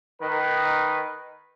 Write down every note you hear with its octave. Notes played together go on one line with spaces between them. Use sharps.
D#3 B4